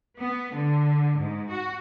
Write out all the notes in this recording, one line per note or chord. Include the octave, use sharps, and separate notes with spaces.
B3
D3
G#2
F#4